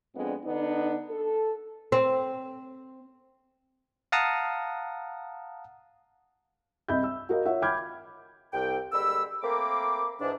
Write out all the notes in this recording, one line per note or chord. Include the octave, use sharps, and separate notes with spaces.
F2 G#3 B3 D4
D3 B3 D4 D#4
A4
C4
F5 F#5 A5 A#5 D#6
C2 D#5 E5 B5 G6
E6
F#4 A#4 D#5 F5
F4 C#5 E5 F#5
G5 B5 D6 F6 G6 G#6
C2 G5
D2 G3 G#3 A#3 B5 E6
A3 A#3 C4 A#4 B5 D6
G#2 E3 F3 D4